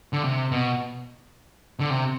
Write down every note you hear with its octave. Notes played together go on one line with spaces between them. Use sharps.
D3
C3
B2
D3
C3